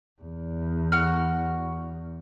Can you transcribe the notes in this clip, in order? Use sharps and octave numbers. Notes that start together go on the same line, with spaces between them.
E2
F#4 F6